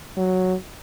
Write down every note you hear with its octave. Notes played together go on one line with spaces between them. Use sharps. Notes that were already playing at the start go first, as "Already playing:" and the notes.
F#3